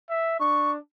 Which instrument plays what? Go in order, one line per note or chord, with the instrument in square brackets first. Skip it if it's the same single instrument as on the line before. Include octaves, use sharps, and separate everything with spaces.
[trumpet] E5
[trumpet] D4 [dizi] C#6